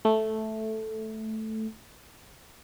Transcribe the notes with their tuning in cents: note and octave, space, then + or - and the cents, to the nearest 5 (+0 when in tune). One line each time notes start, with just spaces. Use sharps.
A3 -5